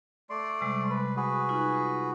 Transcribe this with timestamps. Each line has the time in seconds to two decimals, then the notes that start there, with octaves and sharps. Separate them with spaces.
0.30 A3 D5 C6
0.61 C3 G3 G#3
0.90 B4
1.17 F#4 G#4 B4
1.49 D#4 F4